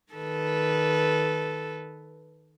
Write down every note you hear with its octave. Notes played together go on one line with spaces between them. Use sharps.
D#3 A4 B4